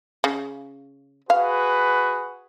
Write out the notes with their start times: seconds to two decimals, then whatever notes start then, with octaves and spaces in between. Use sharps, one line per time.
0.24 C#3
1.30 F#4 G#4 B4 F5